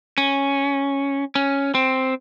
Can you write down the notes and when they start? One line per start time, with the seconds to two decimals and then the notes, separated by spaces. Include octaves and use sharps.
0.18 C#4
1.35 C#4
1.75 C4